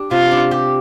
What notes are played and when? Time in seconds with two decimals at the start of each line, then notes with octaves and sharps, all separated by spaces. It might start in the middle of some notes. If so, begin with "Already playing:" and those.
Already playing: D4 G4
0.11 C3 F4
0.31 D4
0.51 G4